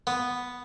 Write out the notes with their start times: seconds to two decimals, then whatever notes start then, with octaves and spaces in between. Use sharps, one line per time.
0.07 B3